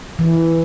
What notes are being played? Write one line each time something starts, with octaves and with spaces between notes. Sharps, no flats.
E3